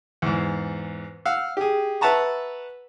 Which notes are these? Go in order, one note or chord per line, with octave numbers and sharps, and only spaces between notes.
E2 G#2
F5 F#5 E6
G4 G#4
B4 E5 F#5 A5 A#5 C#6